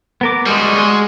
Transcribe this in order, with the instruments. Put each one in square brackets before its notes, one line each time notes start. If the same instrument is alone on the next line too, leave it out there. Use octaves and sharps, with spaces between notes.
[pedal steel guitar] B3 A#4 D6
[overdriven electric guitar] G3 G#3 [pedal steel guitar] F#4 G#5
[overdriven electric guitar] G#3